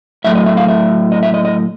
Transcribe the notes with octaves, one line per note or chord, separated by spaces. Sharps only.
A2 F#3 A3 E5
D#5
E5
F5
E5
D#5
E5
D#5
D#5